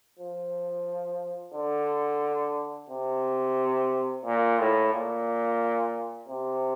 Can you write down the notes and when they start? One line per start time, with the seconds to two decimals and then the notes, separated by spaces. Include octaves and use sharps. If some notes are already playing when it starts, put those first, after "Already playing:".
0.19 F3
1.54 D3
2.90 C3
4.25 A#2
4.59 A2
4.93 A#2
6.29 C3